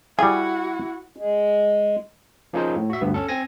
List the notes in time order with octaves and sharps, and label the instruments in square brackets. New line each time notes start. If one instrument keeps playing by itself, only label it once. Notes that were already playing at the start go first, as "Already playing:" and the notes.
[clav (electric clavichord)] G3 G#4 [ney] E4 [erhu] F#4 [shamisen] G#5
[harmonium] G#3
[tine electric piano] F3 A#3 C#4 D#4 G#4 C5
A2
F#4 E5
D2 G2 B3
C#4 A4
C4 G#5 A#6